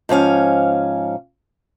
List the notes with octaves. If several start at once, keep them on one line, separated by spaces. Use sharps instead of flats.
G#2 F3 C#4 F5